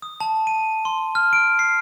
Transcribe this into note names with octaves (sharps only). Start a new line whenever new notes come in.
D#6
A5
D#7
C6
F6
D7
C7